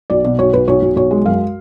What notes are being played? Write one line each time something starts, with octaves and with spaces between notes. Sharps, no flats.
B1 D5
B2 D5
B1 C#5
B1 B4
B1 C#5
B1
B1 C#5
G#3
F#2 F5